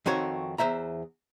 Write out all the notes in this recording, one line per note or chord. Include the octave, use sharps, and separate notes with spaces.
F2 D#3 C4 F#4 C#5
E2 C5 E5 A#5